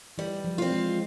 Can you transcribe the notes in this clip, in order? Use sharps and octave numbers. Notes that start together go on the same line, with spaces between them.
E3 G3
F3
C4 F4
G#3